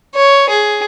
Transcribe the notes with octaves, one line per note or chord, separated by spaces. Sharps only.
C#5
G#4